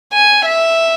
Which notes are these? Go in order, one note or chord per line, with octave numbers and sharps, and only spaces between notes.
G#5
E5